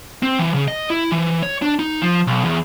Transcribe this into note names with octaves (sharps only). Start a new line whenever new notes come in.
C4
E3
C#3
D#5
E4
E3
C#5
D4
D#4
F3
B1
E2